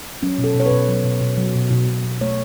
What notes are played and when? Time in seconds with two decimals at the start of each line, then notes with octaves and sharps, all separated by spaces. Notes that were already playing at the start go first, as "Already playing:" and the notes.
0.23 F#3 C#4
0.38 B2
0.44 A4
0.55 B2 C#5
0.66 B4
0.71 B2
0.89 F#3
1.04 B2
1.21 B2
1.38 F#3
1.55 B2
1.71 B2
1.88 B2
2.04 B2
2.21 A3 C#5